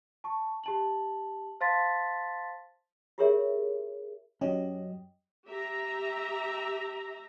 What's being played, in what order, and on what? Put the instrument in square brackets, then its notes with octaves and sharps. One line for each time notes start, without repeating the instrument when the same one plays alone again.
[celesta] A5 C#6
G4 A5 F#7
C5 F5 A5 C6 A6 B6
[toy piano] F4 G4 G#4 A#4 C#5 E5
[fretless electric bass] F#2 C#4 [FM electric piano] F#3 G4 D#5
[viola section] G4 E5 A#5